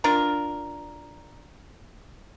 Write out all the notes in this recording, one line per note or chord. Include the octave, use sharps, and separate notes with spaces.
D4 F4 A#4